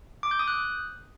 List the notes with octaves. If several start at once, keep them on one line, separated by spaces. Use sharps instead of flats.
D6
G6
D#6
F#6